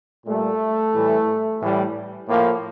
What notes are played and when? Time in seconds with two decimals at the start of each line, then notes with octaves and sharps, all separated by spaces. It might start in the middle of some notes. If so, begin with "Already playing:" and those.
0.26 A#2 G3 A3
0.94 A2 E3 G3
1.60 A2 E3 G3
2.28 A2 F3 A#3